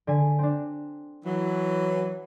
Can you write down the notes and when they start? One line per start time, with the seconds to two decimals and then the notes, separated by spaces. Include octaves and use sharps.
0.07 D3 G#5 B6
0.39 C4 D4
1.25 E3 F#3